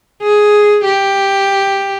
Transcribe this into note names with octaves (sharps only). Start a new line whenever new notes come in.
G#4
G4